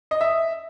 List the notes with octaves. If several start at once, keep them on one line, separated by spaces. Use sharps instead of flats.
D#5
E5